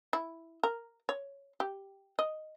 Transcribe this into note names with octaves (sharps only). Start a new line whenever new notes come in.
E4
A#4
C#5
G4
D#5